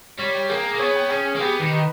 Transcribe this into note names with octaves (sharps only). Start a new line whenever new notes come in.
G3 C#5
G5
A#3 G#4
G#4
A#3
B3 C#5
G5
C#4 G#4
G#4
A#3
B3 G4
D#3 B4
D#4